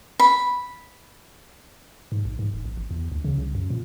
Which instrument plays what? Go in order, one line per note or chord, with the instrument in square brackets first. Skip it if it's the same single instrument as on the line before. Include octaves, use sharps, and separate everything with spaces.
[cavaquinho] B5
[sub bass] G#2
A#1
G#2
E1
A#1
G#1
E2
D2
C#3
C2
F#2
A#2